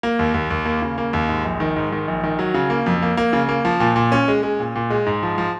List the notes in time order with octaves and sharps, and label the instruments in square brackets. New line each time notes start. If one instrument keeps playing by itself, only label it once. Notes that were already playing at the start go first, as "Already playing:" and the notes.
[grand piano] A#3
D#2
D#2
D#2
A#3
C#3
A#3
D#2
G#2
A#1
D#3
G#2
D#3
A#1
D#3
F#3
C#3
A#3
F2
A#3
A#3
C#3
A#3
F3
A#2
A#2
C#4
G#3
G#3
A#2
A#2
G#3
G#2
F3
F3